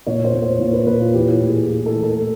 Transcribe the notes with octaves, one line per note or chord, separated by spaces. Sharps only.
A#2 C#5
C5
A#2
C5
A#2
B4
A#2 B4
F4
E3 G4
A2
G#4
A2
A4
E3
A4